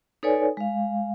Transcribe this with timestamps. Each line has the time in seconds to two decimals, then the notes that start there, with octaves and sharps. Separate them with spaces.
0.23 D#4 A4 B4 C#5 D5 G#5
0.57 G#3 F5